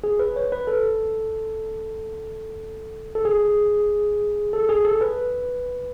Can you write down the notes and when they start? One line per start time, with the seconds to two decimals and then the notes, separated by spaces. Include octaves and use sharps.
0.04 G#4
0.19 B4
0.36 C#5
0.52 B4
0.67 A4
3.15 A4
3.25 G#4
4.53 A4
4.69 G#4
4.85 A4
5.01 B4